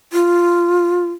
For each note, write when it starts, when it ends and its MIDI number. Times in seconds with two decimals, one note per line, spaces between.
0.13 1.11 65